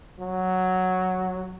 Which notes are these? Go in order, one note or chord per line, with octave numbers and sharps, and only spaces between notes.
F#3